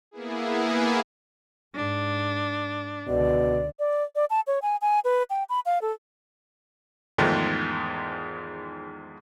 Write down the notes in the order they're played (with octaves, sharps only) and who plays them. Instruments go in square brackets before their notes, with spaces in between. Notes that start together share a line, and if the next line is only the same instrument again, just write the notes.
[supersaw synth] A#3 B3 E4 G#4
[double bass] G#2 [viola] D4
[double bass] C#2 D3 [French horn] B2 [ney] D5
[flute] D5
D5
A5
C#5
G#5
G#5
B4
G5
B5
F5
A4
[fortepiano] E2 G#2 D#3 F3 G#3 A3